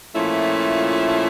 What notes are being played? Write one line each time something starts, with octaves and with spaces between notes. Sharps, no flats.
A#2 F3 A3 C#4 E4